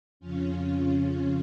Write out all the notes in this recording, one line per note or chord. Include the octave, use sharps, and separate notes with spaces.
F2 C#3 C#4 F4